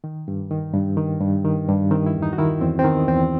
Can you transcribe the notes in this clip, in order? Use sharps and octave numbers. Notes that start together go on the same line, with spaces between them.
D#3
G2
D#3
G2
D#3
G2
D#3
G2
D#3 C4
E4
E2
D#4
F#4
D#3 E4
E2 C4
C4
D#3 B3
E2 C4